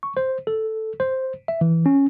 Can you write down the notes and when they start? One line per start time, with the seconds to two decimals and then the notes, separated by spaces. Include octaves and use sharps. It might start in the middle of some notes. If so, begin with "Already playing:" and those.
0.03 C#6
0.17 C5
0.47 A4
1.00 C5
1.48 E5
1.61 E3
1.86 C#4